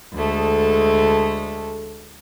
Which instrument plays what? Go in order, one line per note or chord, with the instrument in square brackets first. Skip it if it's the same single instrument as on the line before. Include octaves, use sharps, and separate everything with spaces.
[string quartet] D2 G#3 A3 A4